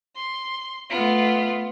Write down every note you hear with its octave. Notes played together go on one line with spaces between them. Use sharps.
C6
A3 B3 F4